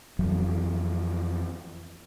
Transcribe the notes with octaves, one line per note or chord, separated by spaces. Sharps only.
F2 E3 F#3